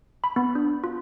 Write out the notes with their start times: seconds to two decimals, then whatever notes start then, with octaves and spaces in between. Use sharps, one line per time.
0.24 B5
0.36 B3
0.55 D4
0.84 F4